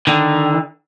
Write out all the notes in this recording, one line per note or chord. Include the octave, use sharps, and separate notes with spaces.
D3 D#3